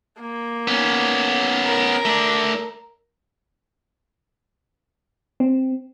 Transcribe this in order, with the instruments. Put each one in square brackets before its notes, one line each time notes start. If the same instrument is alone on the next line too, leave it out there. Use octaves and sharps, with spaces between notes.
[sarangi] A#3
[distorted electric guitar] B3 C#4
[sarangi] A#4
[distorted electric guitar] A3 D5
[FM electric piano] C4